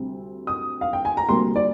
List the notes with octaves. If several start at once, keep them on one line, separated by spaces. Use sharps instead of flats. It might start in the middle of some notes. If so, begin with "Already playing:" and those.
Already playing: D2 C3 G3 C4
D#6
F5
G5
G#5
A#5
D2 C3 G3 A#3 C6
D5